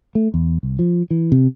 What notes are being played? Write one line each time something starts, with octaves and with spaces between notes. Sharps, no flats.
A3
E2
C2
F3
E3
C3